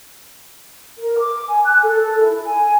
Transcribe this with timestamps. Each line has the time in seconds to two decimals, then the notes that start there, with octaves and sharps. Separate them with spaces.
0.99 A#4
1.19 D6
1.48 G#5
1.65 F#6
1.83 A4
2.00 A4
2.19 E4
2.46 G#5